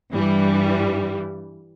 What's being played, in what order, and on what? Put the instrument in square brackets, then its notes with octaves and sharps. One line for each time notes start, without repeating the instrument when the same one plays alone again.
[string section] G2 E3 G3